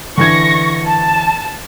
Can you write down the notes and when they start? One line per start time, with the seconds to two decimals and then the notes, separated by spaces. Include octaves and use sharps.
0.17 D3 E3 C#6 G#6 A#6
0.86 A5